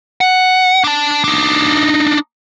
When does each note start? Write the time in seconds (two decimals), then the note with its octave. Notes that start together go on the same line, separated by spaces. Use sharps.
0.21 F#5
0.84 D4 A5
1.24 D4 D#4